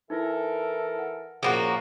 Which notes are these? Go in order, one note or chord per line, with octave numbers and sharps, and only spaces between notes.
E3 D#4 E4 A4 A#4
F#5
F#2 A#2 F3 A#3 F#4 G#4 F#5 F#6